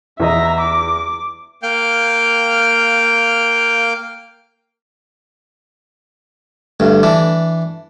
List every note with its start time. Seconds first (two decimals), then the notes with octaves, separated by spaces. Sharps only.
0.20 E2 B3 D#5 E5 A#5
0.61 D6
1.63 A#3 F5 G5 F6 G6
6.80 D2 G2
7.03 E3 D4